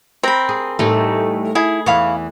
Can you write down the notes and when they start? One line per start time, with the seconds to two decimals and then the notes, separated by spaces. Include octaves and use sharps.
0.23 C4 A#4 B5
0.49 G#4
0.79 A2 E3 G3 A3 D#4
1.55 E4 G#4
1.86 E2 E3 F5 B5 C#6